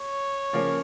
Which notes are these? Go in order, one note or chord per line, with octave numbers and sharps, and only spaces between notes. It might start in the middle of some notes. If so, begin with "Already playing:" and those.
Already playing: C#5
C#3 F3 A#3 C#4